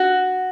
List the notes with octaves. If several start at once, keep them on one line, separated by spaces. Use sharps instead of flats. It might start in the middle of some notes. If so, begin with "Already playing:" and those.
Already playing: F#4